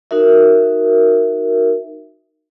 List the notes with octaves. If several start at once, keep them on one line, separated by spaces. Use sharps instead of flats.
D#4 F#4 A#4 E5